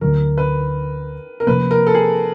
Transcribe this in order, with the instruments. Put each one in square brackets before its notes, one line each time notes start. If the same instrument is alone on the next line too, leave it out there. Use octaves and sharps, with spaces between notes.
[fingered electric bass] D2 D3 F#3 [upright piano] A#4
[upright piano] B4
A#4
[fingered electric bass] C3 F3 A#3 [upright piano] B4
[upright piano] A#4
A4
G#4